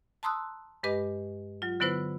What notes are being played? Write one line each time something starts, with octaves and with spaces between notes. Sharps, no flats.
A5 A#5 C6 D#6 E6 F#6
G2 G#3 G4 B4 D#5 D6
F#3 F4
D3 F#3 B3 E4 B4 C5